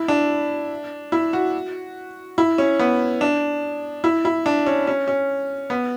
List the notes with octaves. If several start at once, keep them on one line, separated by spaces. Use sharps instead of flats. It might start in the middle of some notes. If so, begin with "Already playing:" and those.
Already playing: E4
D4
E4
F#4
E4
C#4
B3
D4
E4
E4
D4
C#4
C#4
C#4
B3